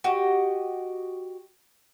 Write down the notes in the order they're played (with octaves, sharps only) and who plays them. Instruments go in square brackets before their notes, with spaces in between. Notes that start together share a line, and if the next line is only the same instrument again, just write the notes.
[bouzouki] F#4 G4 D#5